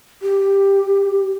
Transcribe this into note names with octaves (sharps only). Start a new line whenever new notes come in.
G4